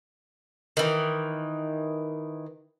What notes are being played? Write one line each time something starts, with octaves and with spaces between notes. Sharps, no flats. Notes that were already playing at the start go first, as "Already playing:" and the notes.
D#3 E3